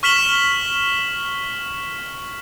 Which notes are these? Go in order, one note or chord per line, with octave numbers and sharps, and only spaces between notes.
C#6 F6 B6 E7 F#7 G7